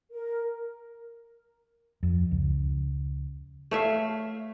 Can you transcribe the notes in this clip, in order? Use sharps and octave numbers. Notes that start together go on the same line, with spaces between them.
A#4
F2
C#2
A3 C#5 E5 F5